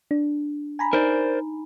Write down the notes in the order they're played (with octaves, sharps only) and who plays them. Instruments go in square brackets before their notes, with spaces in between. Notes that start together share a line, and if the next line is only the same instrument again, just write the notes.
[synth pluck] D4
G#5 A#5 B5
[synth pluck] D#4 [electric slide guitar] A#4 C5 D5